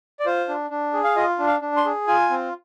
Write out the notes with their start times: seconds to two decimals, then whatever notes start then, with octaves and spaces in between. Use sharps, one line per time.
0.20 D5
0.26 F4 C5
0.49 D4
0.70 D4
0.93 G#4
1.04 F5
1.16 F4 D#5
1.39 D4
1.47 F5
1.61 D4
1.77 C6
1.85 G#4
2.07 F4 G#5
2.30 C4